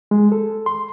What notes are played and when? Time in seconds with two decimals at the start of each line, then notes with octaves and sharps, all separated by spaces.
0.11 G#3
0.32 A4
0.66 C6